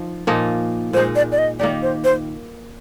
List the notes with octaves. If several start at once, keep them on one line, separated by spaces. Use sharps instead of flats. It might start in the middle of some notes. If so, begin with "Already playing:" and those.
Already playing: F3 D#4
A#2 F3 A#3 D#4
A#2 G#3 D#4 C5
D5
D5
D#5
D#3 A#3 D#4 G4 D5
C5
C5